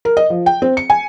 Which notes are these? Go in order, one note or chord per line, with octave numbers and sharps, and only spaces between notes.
A#4
D#5
F3
G5
C4
C#7
G#5